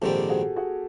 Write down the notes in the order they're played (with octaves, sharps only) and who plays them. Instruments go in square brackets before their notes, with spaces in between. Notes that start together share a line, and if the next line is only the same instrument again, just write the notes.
[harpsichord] A#1 G#2 D#3 G3 C4 [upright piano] G4 A4
[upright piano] F#4 G#4
F#4 G#4